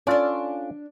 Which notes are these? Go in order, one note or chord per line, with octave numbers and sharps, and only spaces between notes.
C#4 D4 F4 A4 D5